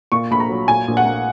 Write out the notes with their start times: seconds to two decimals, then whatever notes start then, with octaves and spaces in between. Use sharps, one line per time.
0.12 A#2 C#6
0.31 A#1 B5
0.40 A#5
0.49 F#3
0.68 A#2 G#5
0.88 A#1
0.97 F#5
1.05 A#3